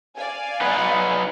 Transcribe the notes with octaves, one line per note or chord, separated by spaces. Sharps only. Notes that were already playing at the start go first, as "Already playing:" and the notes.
D5 F5 G#5
D#4 B4 F#5